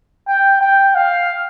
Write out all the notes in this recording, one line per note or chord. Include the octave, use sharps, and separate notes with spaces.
G5
G5
F5